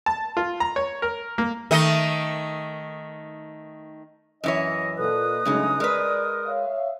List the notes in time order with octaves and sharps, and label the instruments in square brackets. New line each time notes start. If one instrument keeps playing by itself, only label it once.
[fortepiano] A5
F4
A#5
C#5
A#4
A#3
[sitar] D#3 A3 D#5
[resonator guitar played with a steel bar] F#2 E3 C#5 [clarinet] D#5
[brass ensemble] A#2 A4 [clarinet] B4 [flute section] D#5 D#6 F#6
[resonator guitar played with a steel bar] G2 C#3 D#4 [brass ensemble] F#3 G#3 A3
[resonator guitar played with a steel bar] G#3 B4 [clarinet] A#4 [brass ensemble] D5
[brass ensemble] C#5 E5 F5